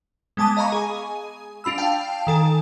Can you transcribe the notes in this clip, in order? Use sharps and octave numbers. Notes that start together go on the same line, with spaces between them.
G#3 B3 G#5 A5 D6 D#6
D#5 F5 A#5 B5 C#6
G#4 G#5
D4 F4 B5 E6
F5 G5 A5
D#3 A4 G#5